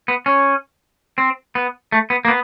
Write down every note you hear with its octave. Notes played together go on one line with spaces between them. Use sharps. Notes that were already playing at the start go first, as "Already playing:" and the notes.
B3
C#4
C4
B3
A3
B3
A#3
B3